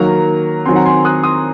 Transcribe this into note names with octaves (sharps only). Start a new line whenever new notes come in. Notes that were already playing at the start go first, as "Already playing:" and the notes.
Already playing: D#3 F#3 A#3 A#5
D#3 F#3 C4 G#5 C6
F#5 A#5
G#5 C6
D#6 F#6
C6 D#6